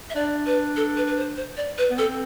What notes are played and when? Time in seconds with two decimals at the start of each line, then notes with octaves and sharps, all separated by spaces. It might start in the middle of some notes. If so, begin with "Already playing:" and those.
0.10 E5
0.15 D4 D5
0.46 B4
0.76 A4
0.97 B4
1.07 B4
1.17 C5
1.37 C5
1.57 D5
1.78 B4
1.91 B3
1.98 C4 A4